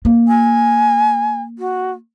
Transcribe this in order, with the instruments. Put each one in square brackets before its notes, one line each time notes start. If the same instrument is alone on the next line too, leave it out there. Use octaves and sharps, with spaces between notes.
[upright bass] A#3
[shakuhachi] G#5
F#4